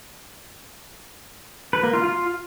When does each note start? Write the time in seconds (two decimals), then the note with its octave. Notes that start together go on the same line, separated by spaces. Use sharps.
1.73 B4
1.83 A#3
1.93 F4
2.04 F4